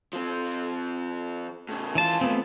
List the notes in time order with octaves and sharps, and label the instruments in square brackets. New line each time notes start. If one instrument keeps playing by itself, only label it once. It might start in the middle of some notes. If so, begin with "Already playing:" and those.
[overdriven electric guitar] F3 C4
A2 C#3
[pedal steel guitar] E3 A5 [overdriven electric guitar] C#4 F4
[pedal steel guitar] A3 B3 C4